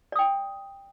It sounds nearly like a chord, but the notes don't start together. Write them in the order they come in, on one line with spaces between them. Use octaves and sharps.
D5 D#6 G5